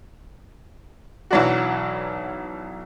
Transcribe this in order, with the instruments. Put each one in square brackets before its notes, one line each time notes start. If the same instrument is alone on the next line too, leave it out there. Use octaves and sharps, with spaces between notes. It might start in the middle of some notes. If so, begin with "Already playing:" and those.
[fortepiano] B1 E3 F#3 D4 F#4